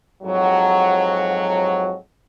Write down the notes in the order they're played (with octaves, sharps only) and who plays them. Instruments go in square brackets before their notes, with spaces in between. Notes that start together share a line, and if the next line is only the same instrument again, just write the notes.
[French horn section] F2 G#2 F#3